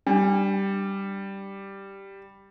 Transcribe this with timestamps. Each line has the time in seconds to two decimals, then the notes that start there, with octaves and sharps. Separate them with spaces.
0.07 G3 D4